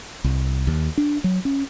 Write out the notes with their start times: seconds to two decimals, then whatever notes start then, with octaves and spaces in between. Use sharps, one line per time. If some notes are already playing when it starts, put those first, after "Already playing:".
0.24 C2
0.67 D#2
0.98 D4
1.24 F#3
1.45 C#4